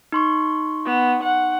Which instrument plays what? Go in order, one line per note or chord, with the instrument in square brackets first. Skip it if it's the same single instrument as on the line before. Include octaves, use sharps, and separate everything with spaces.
[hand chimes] D#4 C6 C#6
[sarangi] B3
F#5